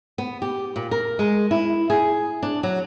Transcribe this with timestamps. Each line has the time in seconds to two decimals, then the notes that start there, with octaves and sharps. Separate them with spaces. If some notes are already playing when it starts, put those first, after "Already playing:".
0.18 B3
0.42 G4
0.76 A#2
0.91 A#4
1.19 G#3
1.51 E4
1.90 G#4
2.43 D4
2.63 F#3